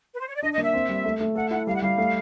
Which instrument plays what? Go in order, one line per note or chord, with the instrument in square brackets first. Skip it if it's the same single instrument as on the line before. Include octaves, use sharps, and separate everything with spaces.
[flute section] B4
C5
C#5
D5
[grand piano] D4 [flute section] D#5
[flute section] D#5
[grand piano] A#3 [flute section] E5
[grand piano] C4
G3
A3
A3
[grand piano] A4 [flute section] F#5
[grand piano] E4 [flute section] F#5
[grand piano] G3 [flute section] F5
[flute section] F#5
[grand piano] G3 [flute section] F5
[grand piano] A3